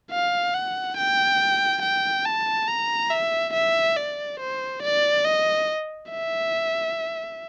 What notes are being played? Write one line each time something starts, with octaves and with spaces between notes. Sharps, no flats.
F5
F#5
G5
G5
A5
A#5
E5
E5
D5
C5
D5
D#5
E5